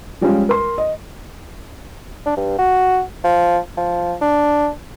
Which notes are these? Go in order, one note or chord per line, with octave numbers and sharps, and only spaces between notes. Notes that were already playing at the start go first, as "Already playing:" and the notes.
F3 G3 G#3 C#4 F4
A#4 C6
D#5
D4
G2
F#4
F3
F3
D4